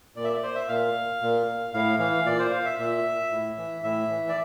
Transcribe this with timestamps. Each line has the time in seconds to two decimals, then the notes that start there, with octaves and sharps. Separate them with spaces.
0.16 A#2 D5
0.24 E5
0.29 D5
0.43 C5
0.55 E5
0.68 A#2 F5
1.22 A#2
1.74 A2 F5
1.99 E3 F5
2.25 A#2 D5
2.39 C5
2.52 F5
2.65 E5
2.79 A#2 E5
3.31 A2
3.57 E3
3.83 A2 E5
4.10 E3
4.28 D5